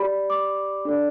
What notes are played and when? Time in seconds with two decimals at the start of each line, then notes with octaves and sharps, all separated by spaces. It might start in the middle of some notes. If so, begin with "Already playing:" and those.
Already playing: G4 D5 B5
0.30 D6
0.85 D4 A4 D5